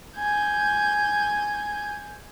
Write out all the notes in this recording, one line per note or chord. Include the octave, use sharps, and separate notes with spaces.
G#5 G6